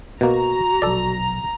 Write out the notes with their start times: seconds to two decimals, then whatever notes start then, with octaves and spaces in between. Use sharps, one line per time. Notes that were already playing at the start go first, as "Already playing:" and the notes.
0.21 B2 A#3 F#4 A#5
0.82 A#1 B2 F#3 A4 D5